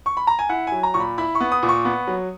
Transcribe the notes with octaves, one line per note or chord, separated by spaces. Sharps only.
C#6
B5
A#5
G#5
E4 F#5
F#3 G#5
A#5
A#2 C#6
B5
E4 B5
C#6
B3
D#6
A#2
C#6
B3
F#3